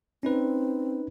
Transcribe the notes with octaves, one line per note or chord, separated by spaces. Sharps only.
C4 C#4 D#4 B4